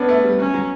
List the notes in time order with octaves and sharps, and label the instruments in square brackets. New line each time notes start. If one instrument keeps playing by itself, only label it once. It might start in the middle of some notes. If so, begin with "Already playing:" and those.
Already playing: [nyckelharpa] B3 [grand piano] C#4 D4
[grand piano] A3
G3
[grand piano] F#3 [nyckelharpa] C#4
[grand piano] F#3